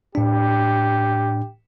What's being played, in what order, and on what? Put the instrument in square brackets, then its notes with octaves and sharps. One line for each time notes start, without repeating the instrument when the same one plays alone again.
[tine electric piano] A2 D4 [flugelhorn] G4